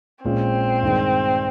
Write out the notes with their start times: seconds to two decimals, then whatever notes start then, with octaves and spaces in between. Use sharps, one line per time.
0.25 A#1 A#2 G#3 C4 C#4
0.83 G2 D#3 G#3